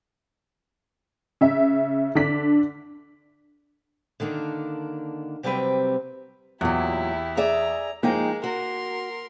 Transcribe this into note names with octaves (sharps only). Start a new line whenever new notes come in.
C#3 E5
D3 D4 B6
D3 D#3 A#3 D4
C3 F#3 G3 C4 B4 G5
E2 A#2 F#3 E4 G4
G#4 D5 E5 A#5
F3 G#3 A#3 D#4 G5
F#4 A#4 C6